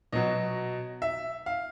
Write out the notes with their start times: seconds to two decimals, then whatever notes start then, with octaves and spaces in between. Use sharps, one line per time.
0.12 B2 F#3 D#5
1.02 E5
1.46 F5